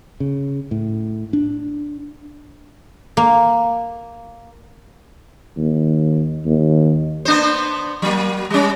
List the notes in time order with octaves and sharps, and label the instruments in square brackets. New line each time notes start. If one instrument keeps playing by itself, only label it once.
[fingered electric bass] C#3
A2
D4
[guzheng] A#3
[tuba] D#2
D#2
[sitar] B3 D4 C5
F#3 A#3
G3 C#4